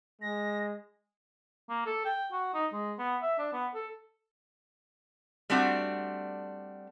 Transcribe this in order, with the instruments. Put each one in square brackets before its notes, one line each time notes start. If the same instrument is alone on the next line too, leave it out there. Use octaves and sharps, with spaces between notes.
[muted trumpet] G#3 [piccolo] A#6
[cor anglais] A#3
A4
G5
F#4
D#4
G#3
B3
E5
D4
B3
A4
[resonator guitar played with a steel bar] G3 A3 C4 D4 F#4